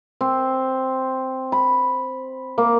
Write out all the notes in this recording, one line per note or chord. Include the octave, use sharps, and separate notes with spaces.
C4
B5
A#3